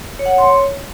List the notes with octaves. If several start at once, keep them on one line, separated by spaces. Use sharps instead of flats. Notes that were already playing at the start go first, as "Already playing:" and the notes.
C#5
F#5
C#5
C6
C#5